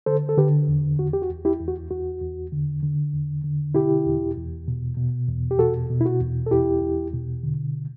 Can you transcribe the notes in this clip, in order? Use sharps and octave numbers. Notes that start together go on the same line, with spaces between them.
D3 A4 C5
A4
D3 G4 B4
E2
E2 F#4
G4
F#4
E2
E4 G4
E2
F#4
E2 F#4
E2
D3
D3
E2
D3
B2 E4 G4
E2
E2
B2
B2
E2
G4
B2 F#4 A4
B2
E4
F#4
E2
A4
E2 E4 G4
E2
B2
D3